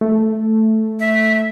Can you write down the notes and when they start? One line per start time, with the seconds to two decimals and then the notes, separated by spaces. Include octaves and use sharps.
0.01 A3
1.00 E5